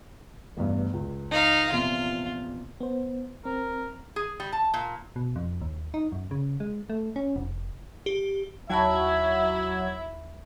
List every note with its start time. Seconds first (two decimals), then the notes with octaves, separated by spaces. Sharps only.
0.57 A1 E2 G2
0.93 C#2
1.31 D#4 F5
1.72 A#1 E2 C3 F4
2.81 B3 C5
3.45 C4 A#4
4.16 G#4
4.40 G3
4.52 A5
4.74 A#2
5.16 B2
5.36 F2
5.61 D#2
5.94 D#4
6.12 F#2
6.31 C#3
6.60 G#3
6.90 A3
7.16 C#4
7.36 F1
8.06 G4
8.70 D#2 F#3 E4 E5 A5 B5 G#6